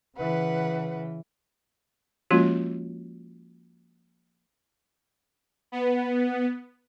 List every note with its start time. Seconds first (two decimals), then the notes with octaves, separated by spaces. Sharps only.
0.17 C#3 E3 B4 F#5
2.31 F3 G#3 A#3 C#4 F4 F#4
5.72 B3